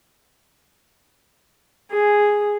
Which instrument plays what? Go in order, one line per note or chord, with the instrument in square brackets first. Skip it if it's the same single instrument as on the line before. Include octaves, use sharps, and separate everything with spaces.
[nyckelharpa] G#4